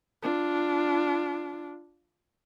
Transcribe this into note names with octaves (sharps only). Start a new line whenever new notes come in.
D4 F4